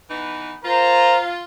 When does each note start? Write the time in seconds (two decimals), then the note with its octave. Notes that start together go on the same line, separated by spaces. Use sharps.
0.10 E3 B3 D#4
0.64 F4 A#4 C5 A#5